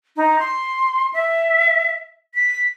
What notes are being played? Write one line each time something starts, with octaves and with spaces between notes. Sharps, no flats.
D#4
C6
E5
B6